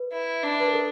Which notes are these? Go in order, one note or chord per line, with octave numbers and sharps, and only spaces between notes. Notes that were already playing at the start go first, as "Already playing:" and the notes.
Already playing: B4
E4
D4
B4
A#4
A4